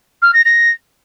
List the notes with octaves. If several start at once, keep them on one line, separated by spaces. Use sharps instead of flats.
F6
A#6
A#6